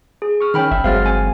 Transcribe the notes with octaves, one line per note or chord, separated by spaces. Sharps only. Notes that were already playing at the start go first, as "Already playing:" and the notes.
G#4
C#6 F6
D#3 C#4 G5 B5 F6
G1 E5
G1 F#3 G#3 C4 F5 F6 A6
G#5